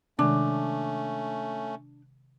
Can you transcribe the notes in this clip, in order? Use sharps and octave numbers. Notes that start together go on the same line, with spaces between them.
C3 D#3 G#3 A3 C#4 D4